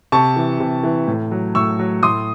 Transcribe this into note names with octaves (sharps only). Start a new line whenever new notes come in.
C3 A5 C#6
E3
C3
E3
A2
F#3
A2 C#6 E6
F#3
A2 C6 D#6